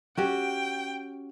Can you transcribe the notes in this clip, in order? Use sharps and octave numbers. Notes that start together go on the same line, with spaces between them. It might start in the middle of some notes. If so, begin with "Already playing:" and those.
C#4 F#4 G4 G5